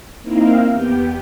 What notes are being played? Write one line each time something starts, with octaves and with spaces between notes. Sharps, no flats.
A#3 C4 D#4 E4 A#4 F5
E2 B3 G4 G5